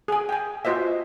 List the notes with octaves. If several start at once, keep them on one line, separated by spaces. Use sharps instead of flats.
G#4 G#5
G5 G#5
F4 F#4 C5 D#5 E5